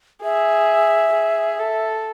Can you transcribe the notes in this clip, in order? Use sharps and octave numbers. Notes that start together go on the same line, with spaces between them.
G#4 E5
G#4
A4